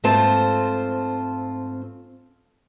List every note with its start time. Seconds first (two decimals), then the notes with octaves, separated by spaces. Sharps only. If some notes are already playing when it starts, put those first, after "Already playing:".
0.04 G#2 A3 C4 F4 C5 A5